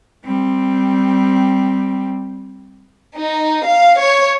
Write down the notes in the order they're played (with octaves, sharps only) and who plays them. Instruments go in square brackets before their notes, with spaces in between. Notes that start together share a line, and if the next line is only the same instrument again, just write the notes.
[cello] G3 C4
[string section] D#4
F5
C#5